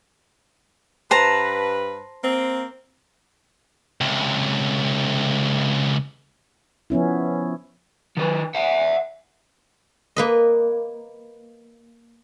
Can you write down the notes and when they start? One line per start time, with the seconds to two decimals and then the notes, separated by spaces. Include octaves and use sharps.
1.11 G2 B4 C5 A5 A#5
2.24 A#3 C4
4.01 C#2 C3
6.90 F3 B3 C#4 E4
8.17 D#3 B4
8.55 E5 F#5
10.16 A#3 B4 D#5